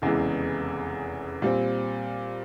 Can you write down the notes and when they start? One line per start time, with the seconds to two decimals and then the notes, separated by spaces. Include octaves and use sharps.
0.02 F1 E2 C#3 E3 G#3
1.42 A#2 G3 C4